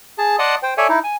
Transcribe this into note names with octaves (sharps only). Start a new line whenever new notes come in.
G#4 A5
D5 D#5 F#5 A5 C6 D#6
C5 G5
A4 C#5 D5 E5 G#5
D#4 E4
G#5